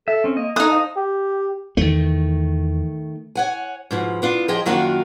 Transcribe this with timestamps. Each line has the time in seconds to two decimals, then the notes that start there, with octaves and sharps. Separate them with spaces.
0.08 A4 E5
0.24 C4 C#4
0.37 A#3 D#5
0.56 D#4 E4 A4 D#6 F#6
0.70 C5 D#5 F5 A5
0.97 G4
1.77 E2 D#3 A3
3.35 C#5 F#5 G#5
3.91 G#2 B2 F3
4.22 B3 D4 F4
4.48 F3 G4 G#4 C5 D#5 G5
4.66 F#2 D#3 A#3 D4 F4 F#4